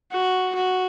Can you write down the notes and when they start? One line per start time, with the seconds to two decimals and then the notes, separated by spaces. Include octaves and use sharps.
0.12 F#4
0.55 F#4